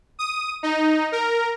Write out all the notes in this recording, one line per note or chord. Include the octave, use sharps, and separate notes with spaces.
D#6
D#4
A#4